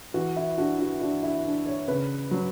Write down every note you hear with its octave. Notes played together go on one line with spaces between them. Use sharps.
E3 F#4
E4
D4 F#4
F#4
D4 F#4
E4
D4
C#5
C#3 B4
F#3